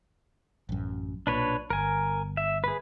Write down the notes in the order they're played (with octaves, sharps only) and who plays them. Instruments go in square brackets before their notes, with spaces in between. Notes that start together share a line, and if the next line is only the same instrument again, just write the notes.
[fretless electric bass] A1 F#2
[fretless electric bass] B1 A#2 [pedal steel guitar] D4 B4 C#5
[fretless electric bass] G1 [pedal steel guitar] A#4 G#5
[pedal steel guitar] E5
G#4 B4